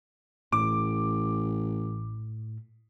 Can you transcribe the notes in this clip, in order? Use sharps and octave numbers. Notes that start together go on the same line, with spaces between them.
A1 A2 D6